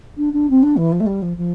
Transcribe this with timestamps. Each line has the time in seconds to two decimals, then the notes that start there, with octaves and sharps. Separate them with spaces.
0.17 D4
0.33 D4
0.50 C4
0.62 D4
0.76 E3
0.92 F3
1.00 A3
1.06 G3
1.22 F3
1.36 F3